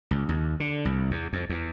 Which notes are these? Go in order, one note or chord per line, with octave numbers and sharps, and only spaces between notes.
C#2
D#2
D3
C2
E2
F2
E2